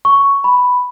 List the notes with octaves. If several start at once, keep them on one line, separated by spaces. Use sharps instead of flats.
C#6
B5